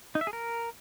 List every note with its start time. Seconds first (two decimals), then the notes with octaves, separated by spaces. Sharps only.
0.15 D#4
0.21 E5
0.27 G#4
0.33 A#4